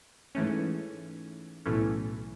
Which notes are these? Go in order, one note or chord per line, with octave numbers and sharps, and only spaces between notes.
G#2 E3 A3 C#4
B1 A2 E3 A3 C#4